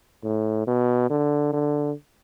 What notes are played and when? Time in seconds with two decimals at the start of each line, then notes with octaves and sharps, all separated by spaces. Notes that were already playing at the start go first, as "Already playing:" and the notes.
0.24 A2
0.67 B2
1.10 D3
1.53 D3